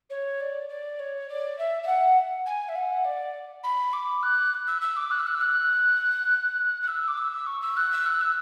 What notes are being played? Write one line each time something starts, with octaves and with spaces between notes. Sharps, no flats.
C#5
D5
D5
C#5
D5
E5
E5
F#5
G#5
E5
F#5
D5
B5
D6
F#6
E6
E6
D6
F#6
E6
F#6
E6
F#6
F#6
E6
D6
E6
C#6
E6
F#6
E6
F#6
E6